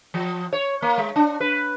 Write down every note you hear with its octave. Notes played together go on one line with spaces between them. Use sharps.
F3
C#5
A#3
G#3
D4
B4